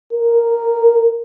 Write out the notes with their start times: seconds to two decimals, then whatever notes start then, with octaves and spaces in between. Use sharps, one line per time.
0.13 A#4